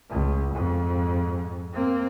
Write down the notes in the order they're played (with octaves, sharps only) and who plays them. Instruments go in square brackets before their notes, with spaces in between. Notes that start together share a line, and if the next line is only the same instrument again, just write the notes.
[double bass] C#2
F2 G#2
A#3 C4